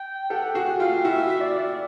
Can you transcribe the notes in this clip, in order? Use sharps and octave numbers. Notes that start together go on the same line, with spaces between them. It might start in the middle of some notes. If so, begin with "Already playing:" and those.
Already playing: G5
G4 A4 F#5
F#4 G#4 F#5
F4 G4 F5
E4 F#4 E5
D5